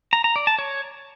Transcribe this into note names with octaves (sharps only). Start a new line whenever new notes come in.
A#5
A#5
D5
A5
C#5